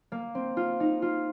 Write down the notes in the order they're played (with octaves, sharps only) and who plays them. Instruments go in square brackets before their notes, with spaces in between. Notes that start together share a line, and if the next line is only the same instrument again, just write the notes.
[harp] A#3
C4
F4
D#4
F4